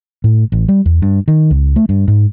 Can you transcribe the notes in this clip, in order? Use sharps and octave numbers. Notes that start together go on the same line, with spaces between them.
A2
A1
G3
E2
G2
D#3
C#2
A3
G2
G#2